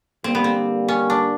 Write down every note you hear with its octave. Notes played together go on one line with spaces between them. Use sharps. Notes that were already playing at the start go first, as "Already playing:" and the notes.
D3 G3 A#3 C4
B3
C4
C#4
D4